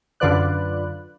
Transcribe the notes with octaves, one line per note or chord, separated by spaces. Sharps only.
F#2 D3 F4 B4 D5 F#6